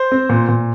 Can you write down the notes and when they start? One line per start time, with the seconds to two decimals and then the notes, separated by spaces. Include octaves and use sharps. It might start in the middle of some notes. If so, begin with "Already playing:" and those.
Already playing: C5
0.12 C4
0.29 A#2
0.48 A#2